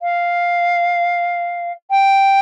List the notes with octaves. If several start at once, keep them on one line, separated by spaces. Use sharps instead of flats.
F5
G5